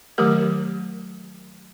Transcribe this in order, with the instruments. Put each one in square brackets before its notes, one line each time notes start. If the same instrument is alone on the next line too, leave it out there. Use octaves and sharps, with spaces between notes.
[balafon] D#3 F#3 A3 G4 A#4